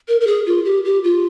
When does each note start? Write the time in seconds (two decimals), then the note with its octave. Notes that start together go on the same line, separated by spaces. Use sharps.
0.08 A#4
0.21 A#4
0.27 G#4
0.46 F4
0.65 G4
0.85 G4
1.04 F4